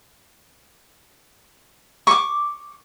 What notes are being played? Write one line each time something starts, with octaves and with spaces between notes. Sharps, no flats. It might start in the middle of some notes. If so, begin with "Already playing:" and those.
C#6 D6